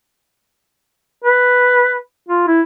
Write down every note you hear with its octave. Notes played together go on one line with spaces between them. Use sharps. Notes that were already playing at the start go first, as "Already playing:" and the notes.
B4
F4
E4